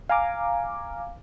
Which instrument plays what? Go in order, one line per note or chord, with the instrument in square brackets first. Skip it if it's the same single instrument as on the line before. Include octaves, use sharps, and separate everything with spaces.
[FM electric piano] F5 G#5 A#5 D6